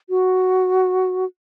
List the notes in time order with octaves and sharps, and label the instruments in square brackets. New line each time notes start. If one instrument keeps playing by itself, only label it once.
[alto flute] F#4